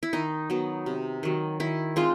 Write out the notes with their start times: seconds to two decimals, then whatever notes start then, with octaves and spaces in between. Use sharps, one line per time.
0.03 E4
0.13 D#3 D#4
0.50 F#3 B3 D#4
0.86 C3
1.23 D#3 F#3
1.60 D#3 E4
1.96 G#3 C4 D#4 F4